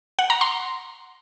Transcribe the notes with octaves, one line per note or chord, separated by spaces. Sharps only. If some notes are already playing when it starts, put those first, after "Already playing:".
F#5
A#5
C6